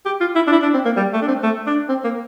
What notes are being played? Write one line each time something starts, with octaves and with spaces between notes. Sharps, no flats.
G4
F4
E4
D4
E4
D4
C4
A#3
G3
A3
D4
C4
A3
D4
C4
A#3